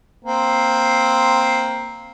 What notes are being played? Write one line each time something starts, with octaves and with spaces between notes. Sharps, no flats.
A#3 C4